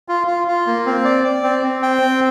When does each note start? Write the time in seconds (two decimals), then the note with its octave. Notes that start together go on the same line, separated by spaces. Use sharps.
0.08 F4
0.27 F4
0.48 F4
0.67 A#3
0.86 C4
1.05 D5
1.24 D5
1.43 C4
1.63 C4
1.82 G5
2.02 C4